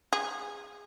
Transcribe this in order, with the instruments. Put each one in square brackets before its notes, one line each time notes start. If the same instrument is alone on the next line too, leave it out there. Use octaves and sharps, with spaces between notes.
[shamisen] G#4